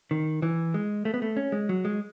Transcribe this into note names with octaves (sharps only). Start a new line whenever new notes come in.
D#3
E3
G#3
A3
B3
A3
C#4
G#3
F#3
G#3